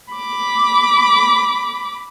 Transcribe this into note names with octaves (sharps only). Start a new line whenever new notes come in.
B5 D6